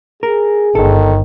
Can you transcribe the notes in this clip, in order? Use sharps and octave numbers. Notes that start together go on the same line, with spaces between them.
G#4 A#4
G1 D#3 A4